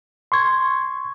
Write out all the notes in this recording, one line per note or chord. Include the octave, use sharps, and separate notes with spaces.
C6 C#6 G#6